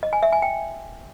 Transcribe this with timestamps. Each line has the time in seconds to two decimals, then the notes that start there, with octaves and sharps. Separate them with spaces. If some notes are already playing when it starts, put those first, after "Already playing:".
0.03 D#5
0.13 G#5
0.23 E5
0.32 G#5
0.42 G5